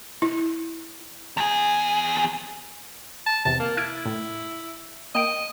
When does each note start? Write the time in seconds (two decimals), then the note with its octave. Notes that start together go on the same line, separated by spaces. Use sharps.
0.22 E4
1.37 E2 G#4
3.26 A5
3.45 E2 C3 A5
3.60 A#3
3.77 E4 F6 G#6 D7
4.06 A2
5.15 A#3 D#5 G5 D7